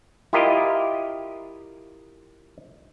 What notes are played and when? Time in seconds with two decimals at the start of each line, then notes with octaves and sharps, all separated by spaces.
0.33 E4 F4 G4 A#4 D#5